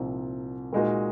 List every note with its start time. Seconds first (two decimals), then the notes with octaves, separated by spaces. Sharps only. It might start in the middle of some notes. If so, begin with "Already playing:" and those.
Already playing: C2 A#2 F3 C4 D#4
0.73 A#2 G#3 D#4 F#4 A#4